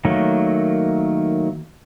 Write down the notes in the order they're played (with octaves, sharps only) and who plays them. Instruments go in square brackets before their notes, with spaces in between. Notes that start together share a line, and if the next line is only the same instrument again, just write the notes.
[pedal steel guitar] D#3 F#3 A3 A#3